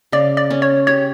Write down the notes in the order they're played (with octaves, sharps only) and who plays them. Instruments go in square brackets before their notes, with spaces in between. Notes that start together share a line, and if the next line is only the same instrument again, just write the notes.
[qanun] C#3 [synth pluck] D5
[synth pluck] D5
[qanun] C#4
[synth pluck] C#5
[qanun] G4 [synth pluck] C#5